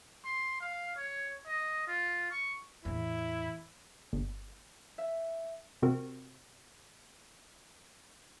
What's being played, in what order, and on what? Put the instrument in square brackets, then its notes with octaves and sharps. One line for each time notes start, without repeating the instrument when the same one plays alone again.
[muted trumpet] C6
F5
C#5
D#5
F4
C#6
[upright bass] E2 A2 [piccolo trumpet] E4
[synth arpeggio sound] G1
[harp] E5
[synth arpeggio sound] C3 C4 F#4 A#4